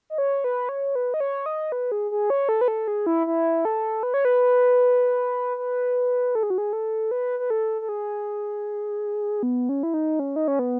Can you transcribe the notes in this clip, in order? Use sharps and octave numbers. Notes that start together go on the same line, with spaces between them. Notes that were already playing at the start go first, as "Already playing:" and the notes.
D#5
C#5
B4
C#5
B4
D#5
C#5
D#5
B4
G#4
G#4
C#5
A4
B4
A4
G#4
E4
E4
A4
B4
C#5
B4
B4
A4
G#4
F#4
G#4
A4
B4
B4
A4
A4
G#4
B3
C#4
E4
D#4
C#4
D#4
C#4
B3